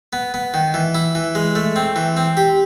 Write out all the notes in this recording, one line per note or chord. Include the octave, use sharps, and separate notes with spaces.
B3
B3
D#3
E3
E4
E3
G#3
A3
C4
E3
C4
G4